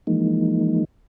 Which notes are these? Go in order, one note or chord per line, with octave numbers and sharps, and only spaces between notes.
E3 F3 G#3 A#3 D#4